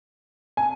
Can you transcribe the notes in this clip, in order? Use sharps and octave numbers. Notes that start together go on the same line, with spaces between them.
G#5